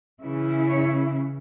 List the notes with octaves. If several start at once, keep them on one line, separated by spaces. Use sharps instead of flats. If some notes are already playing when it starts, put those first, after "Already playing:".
C#3 E3 C#4 E4
C#5